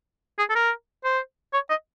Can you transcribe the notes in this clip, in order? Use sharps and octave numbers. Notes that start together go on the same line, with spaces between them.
G#4
A4
A#4
C5
C#5
D#5